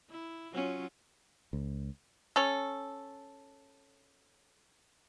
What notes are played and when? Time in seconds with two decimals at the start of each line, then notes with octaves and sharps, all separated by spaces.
0.10 E4
0.52 F#3 C#4 F4
1.53 C#2
2.36 C#4 A4